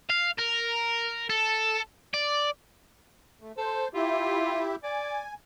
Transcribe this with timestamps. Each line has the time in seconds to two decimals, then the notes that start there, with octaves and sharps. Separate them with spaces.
0.09 F5
0.38 A#4
1.30 A4
2.14 D5
3.41 A3
3.57 A4 C5
3.94 E4 F4 G4 E5
4.83 D5 G#5